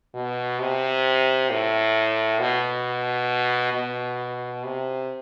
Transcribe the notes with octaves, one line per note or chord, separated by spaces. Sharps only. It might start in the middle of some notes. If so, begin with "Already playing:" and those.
B2
C3
A2
B2
B2
C3